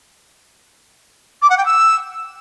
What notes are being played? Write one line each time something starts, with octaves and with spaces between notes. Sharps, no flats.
D6
F#5
G5
E6